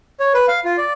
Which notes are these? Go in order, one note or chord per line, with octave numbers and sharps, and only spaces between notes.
C#5
B4
F5
F4
D5